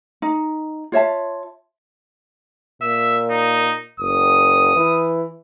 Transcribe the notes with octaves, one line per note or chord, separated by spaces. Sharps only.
D#4
F4 C#5 E5 A5
A#2 E5
D#4
F#1 D#6
E3